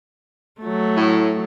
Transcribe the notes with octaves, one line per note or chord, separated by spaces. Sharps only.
F#3 A3
A2